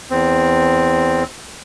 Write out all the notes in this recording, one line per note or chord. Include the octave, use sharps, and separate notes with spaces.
E2 C4